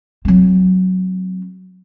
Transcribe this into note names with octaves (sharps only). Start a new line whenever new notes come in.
F#3 C4